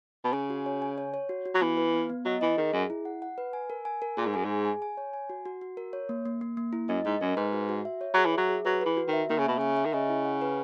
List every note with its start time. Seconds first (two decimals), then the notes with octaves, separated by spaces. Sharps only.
0.24 B2
0.33 C#3 G#5
0.50 F#4
0.66 C#5
0.82 G#5
0.98 C#5
1.14 C#5
1.29 F#4
1.45 F#4
1.54 F#3
1.61 E3 B3
1.77 B4
1.94 B3
2.09 B3
2.25 F#3 D#5
2.41 E3 D#5
2.57 D#3 G#4
2.73 F#2 G#4
2.90 E4
3.05 F#5
3.22 F#5
3.38 B4
3.53 G#5
3.70 A#4
3.85 G#5
4.02 A#4
4.17 A#2 G#4
4.26 G#2
4.34 F#2 G#5
4.44 G#2 G#4
4.65 G#5
4.82 G#5
4.97 C#5
5.14 G#5
5.30 F#4
5.45 F#4
5.61 F#4
5.77 A#4
5.93 C#5
6.09 A#3
6.25 A#3
6.41 A#3
6.57 A#3
6.73 E4
6.89 F#2 D#5
7.05 G#2 D#5
7.21 F#2 A#4
7.37 G#2 B4
7.53 F#4
7.69 F#4
7.85 E5
8.01 C#5
8.14 F#3 G#4
8.26 E3
8.33 F#3 E5
8.49 G#4
8.65 F#3 B4
8.81 E3 B4
8.97 F#4
9.08 D#3
9.13 E5
9.29 D#3 A#3
9.38 C#3
9.44 B2 E5
9.58 C#3 E5
9.77 E5
9.85 D#3
9.93 C#3 D#5
10.09 E4
10.25 F#5
10.42 B4